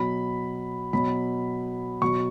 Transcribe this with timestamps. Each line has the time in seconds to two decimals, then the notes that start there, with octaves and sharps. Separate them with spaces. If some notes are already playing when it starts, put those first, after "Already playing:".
Already playing: B2 F#3 B5
0.93 B2 F#3 B5
2.02 B2 F#3 C#6